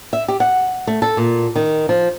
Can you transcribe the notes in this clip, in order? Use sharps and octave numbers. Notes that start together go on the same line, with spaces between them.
E5
G4
F#5
A3
A4
A#2
D#3
F3